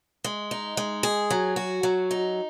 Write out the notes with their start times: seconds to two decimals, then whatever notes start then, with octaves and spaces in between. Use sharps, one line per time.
0.24 G#3
0.51 D#4
0.77 G#3
1.03 G#4
1.30 F#3
1.56 F#4
1.83 F#3
2.11 D#4